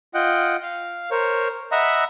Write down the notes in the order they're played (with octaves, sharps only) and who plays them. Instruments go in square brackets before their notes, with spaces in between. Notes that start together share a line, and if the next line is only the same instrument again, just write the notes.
[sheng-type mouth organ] F4 D#5 F#5 G5
F5
A#4 C5 C#5
D#5 E5 F#5 A#5 B5 E6